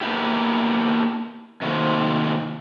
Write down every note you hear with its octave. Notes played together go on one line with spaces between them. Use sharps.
A#3 B3 D4 E4 G4
C3 D#3 F#3 A3 A#3 C4